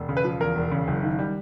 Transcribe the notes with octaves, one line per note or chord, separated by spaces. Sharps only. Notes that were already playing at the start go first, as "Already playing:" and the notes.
Already playing: E1
C#3
B4
F3
E2 A#4
E1
C#3
F#1
D#3
G3